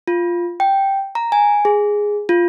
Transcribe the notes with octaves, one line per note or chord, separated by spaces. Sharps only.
F4
G5
A#5
G#5
G#4
F4